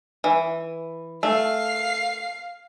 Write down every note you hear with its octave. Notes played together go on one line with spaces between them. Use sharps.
E3
A3 F5 C7